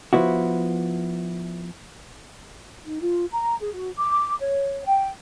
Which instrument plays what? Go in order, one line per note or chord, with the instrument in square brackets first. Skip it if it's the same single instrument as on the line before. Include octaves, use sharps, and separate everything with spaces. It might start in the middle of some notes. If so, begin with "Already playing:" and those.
[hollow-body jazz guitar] F3 B3 E4 F#4
[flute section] D#4
F4
A#5
G#4
F#4
D6
C#5
G5